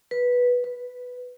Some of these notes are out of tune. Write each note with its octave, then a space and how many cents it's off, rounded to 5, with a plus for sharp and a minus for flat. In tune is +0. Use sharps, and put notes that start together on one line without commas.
B4 -10
B4 +5